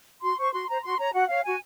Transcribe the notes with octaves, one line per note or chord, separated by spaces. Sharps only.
F#4 C6
C5 C#6
F#4 C6
C5 A#5
F#4 C6
C#5 A#5
F#4 F#5
C#5 F5
F#4 G#5